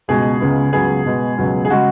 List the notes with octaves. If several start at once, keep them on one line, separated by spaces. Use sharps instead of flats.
C#2 B2 G#3 G#4
C#2 C#3 G#3 B3
C#2 C#3 F#3 B3 G#4
B2 G#3 B3
C#2 B2 F#3 B3
G#4
C#3 G#3 F#4